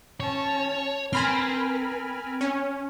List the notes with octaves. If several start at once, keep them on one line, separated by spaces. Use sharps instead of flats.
C#4 C#5 A5
C4 A#4 B4 G#5 B5 C6 F6
C#4